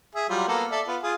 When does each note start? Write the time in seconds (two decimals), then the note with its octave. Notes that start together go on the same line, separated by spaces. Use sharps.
0.15 G#4 E5
0.29 F#3 G3 F4
0.48 A#3 B3 A4
0.71 A4 D5 E5
0.87 B3 F4
1.03 F4 G#4